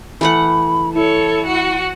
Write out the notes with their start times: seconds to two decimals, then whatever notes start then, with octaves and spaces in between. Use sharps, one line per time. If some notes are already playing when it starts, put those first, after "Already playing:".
0.21 E3 A3 F#5 B5
0.95 E4 A4 C#5
1.46 F#4 F#5